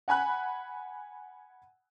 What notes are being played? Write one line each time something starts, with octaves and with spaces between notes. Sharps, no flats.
F#5 G#5 B5 F#6